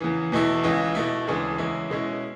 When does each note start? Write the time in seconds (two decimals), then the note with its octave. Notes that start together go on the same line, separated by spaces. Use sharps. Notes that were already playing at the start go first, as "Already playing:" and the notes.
0.01 E2 C#3 E3
0.32 E2 B2 A3 E4
0.63 C#2 C#3 E3
0.95 B2 A3 E4
1.27 D2 C#3 E3 G#3 D4
1.58 E2 C#3 G#3 C#4 E4
1.90 B2 G#3 C#4 E4